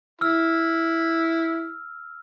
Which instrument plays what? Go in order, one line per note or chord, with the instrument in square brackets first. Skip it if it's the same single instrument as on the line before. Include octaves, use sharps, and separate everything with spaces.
[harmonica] E4 [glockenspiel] E6 F6